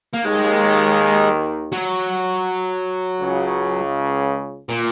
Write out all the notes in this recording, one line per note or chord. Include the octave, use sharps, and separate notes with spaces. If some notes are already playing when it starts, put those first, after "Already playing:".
A#3
D#2 D#3 G#3
F#3
C#2 C#3
A#2